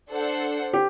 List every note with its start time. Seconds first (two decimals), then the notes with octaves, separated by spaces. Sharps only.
0.10 D4 A4 C5 F#5
0.73 G4